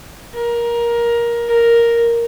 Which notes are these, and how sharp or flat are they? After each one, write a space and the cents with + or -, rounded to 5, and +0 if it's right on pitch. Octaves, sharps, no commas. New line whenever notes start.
A#4 +15
A#4 +0